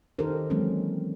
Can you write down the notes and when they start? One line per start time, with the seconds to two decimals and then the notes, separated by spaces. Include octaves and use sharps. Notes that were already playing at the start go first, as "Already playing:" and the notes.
0.19 D#3 D#4 G4 A4 A#4 C5
0.50 E3 F#3 G#3 A#3 C4 C#4